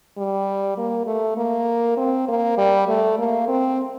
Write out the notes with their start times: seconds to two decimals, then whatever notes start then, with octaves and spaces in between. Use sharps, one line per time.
0.18 G3
0.78 A#3
1.07 A3
1.37 A#3
1.97 C4
2.28 A#3
2.58 G3
2.88 A3
3.19 A#3
3.48 C4